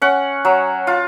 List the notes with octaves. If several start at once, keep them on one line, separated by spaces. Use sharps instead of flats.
C#4 F#5
F#3
F4